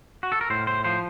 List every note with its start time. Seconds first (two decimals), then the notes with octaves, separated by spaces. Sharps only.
0.23 F#4
0.32 A4
0.41 A#4
0.50 A2 C5
0.67 C5
0.84 F3 C5